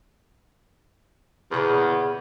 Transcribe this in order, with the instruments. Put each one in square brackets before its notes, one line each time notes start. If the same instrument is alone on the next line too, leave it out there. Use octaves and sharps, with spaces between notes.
[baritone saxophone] E2 [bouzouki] A#2 C#3 B3